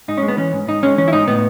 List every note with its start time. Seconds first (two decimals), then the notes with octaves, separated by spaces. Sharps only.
0.08 G#2 D#4
0.18 C#4
0.23 G#3
0.28 B3
0.37 E3 C#4
0.53 G#2
0.67 G#2 D#4
0.83 G#3 C#4
0.97 E3 C#4
1.08 E4
1.13 G#2 D#4
1.28 A2 B3